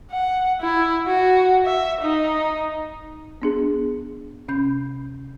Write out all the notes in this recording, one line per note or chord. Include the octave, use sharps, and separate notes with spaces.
F#5
E4
F#4
E5
D#4
B3 D4 G#4
C3 C#4 B5 G6